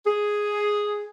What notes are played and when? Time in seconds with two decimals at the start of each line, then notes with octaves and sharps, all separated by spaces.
0.07 G#4